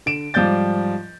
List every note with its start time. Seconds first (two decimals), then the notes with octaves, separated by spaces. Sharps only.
0.06 D3 D7 E7
0.34 G#2 F3 G3 D5 G6 A6